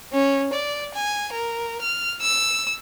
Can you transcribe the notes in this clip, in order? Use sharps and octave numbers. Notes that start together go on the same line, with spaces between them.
C#4
D5
G#5
A#4
F6
E6